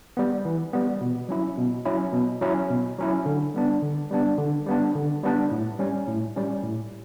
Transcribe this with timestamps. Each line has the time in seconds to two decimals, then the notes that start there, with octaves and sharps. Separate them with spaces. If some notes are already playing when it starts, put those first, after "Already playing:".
0.17 G3 B3
0.45 E3
0.73 G3 B3
1.01 B2
1.29 F#3 C#4 E4
1.57 B2
1.85 F#3 C#4 E4
2.13 B2
2.41 F#3 C#4 E4
2.70 B2
2.98 F#3 C#4 E4
3.26 D3
3.54 G3 B3 D4
3.82 D3
4.11 G3 B3 D4
4.38 D3
4.66 G3 B3 D4
4.95 D3
5.23 G3 B3 D4
5.51 A2
5.79 G3 C#4
6.08 A2
6.36 G3 C#4
6.63 A2